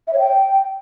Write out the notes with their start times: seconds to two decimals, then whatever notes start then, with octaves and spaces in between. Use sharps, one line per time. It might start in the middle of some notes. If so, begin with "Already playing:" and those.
0.07 E5
0.13 C#5
0.19 G5